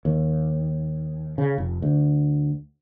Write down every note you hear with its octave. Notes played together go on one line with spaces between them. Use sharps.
D#2
C#3
F1
D2